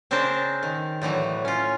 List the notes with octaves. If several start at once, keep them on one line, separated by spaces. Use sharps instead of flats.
C#3 C4 D4 A#4 C5 A5
D#3
A2 D3 E3 F#3
C#4 F4